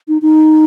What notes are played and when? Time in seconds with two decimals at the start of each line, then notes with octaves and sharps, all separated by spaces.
0.08 D#4
0.22 D#4